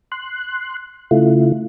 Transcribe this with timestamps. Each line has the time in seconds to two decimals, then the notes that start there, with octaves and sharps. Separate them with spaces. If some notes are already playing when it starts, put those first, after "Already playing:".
0.12 C6 F#6
1.11 C#3 A3 E4 F4